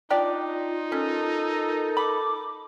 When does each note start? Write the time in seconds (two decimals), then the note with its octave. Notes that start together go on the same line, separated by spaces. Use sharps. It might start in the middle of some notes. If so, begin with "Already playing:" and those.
0.10 D4 D#4 F4 G4 D5
0.92 C#4 A4 A#4
1.97 B5 D6